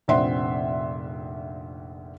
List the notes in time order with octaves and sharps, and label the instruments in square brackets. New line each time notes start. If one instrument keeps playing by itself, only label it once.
[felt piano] F1 A#1 C4 E5 F#5 C6